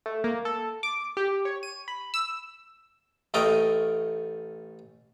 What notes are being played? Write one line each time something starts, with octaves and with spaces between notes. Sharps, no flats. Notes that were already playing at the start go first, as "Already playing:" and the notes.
A3
A#3
A4
D6
G4
C#5
D#7
B5
E6
A1 A3 A4 A#4 D#5 G5